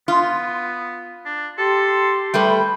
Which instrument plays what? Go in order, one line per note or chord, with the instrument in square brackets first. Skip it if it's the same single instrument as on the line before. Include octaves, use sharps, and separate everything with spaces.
[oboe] B3 [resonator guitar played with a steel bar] F4
[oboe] D4
[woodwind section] G4 C6 [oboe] A4
[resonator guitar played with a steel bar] G3 A3 B4 [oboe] G5